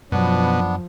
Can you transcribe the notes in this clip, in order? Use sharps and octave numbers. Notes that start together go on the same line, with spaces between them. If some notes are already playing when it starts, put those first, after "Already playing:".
F#2 B2 F3 F#3 B3 D4